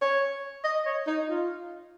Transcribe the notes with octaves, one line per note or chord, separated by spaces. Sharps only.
C#5
D#5
C#5
D#4
F4